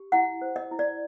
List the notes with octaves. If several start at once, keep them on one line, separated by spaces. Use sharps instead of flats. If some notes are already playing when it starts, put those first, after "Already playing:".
Already playing: G4
E4 F#5
C5
D#5
E4
D5